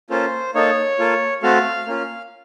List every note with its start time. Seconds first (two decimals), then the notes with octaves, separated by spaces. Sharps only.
0.10 A#3 C#4 F4 A4 C5
0.54 A#3 D#4 A4 C#5
0.99 A#3 F4 A4
1.43 A3 C4 F#4 A4 F5
1.87 A#3 C#4 F4